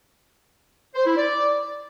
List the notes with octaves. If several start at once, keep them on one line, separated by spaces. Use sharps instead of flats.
C5
E4
D5